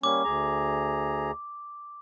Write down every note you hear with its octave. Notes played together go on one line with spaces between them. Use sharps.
G3 A#3 C#4 D6
D2 G#4 A#5